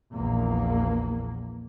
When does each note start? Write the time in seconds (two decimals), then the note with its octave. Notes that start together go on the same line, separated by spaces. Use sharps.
0.14 A#1 E2 A#3